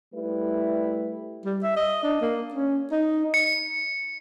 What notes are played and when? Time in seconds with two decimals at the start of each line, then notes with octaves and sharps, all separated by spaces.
0.14 G3 A3 E4 B4
1.45 G3
1.63 E5
1.76 D#5
2.04 D4
2.22 A#3
2.54 C#4
2.92 D#4
3.34 C#7